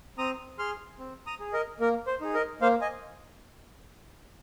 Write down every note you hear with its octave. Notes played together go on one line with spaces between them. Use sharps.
C4 A#5 D#6
G#4 C6 F6
C4
A#5 D#6
G#4
A#4 D#5
A#3 A#4
C5
D#4 G#4
A#4 D#5
A#3 C5 F5
D#5 G#5